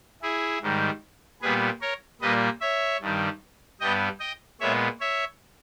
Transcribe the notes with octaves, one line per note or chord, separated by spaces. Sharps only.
E4 G#4
G#2 D#3 G3
A#2 G3 B3 G#4 B4
A#4 C#5
A#2 G3 A#3 B4 D#5
C#5 E5
G2 D#3 G3
G2 G3 B3 D#5 G5
D#5 G5
A#2 G#3 B3 C#5 E5
C#5 E5